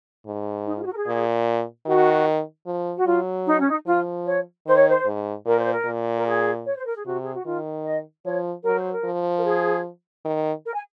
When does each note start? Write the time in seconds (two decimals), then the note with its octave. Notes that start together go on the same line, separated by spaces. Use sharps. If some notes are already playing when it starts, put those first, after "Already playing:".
0.26 G#2
0.67 D#4
0.77 F4
0.82 G#4
0.86 F#4
0.92 A#4
0.96 G#4
1.07 A#2
1.86 D#3 F#4
2.66 F3
2.96 F#4
3.06 F#3 F4
3.47 D#4
3.59 C#4
3.70 D#4
3.86 F3 F4
4.26 C#5
4.66 D#3 C5
4.77 C#5
4.88 C5
5.06 G#2
5.46 A#2 A#4
5.58 C5
5.72 A#4
5.85 A#2
6.18 A#4
6.25 G#4
6.66 C#5
6.76 C5
6.86 A#4
6.96 G#4
7.05 C3 F#4
7.24 G#4
7.35 F#4
7.45 D#3 F4
7.85 D#5
8.25 F3 C#5
8.65 F#3 A#4
8.79 C5
8.92 A#4
9.05 F3
9.37 A#4
9.44 G#4
10.25 D#3
10.65 A#4
10.75 G#5